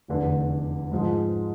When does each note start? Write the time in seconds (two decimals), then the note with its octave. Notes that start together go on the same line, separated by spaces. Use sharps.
0.08 F1 E2 D3
0.91 G#2 F3 G#3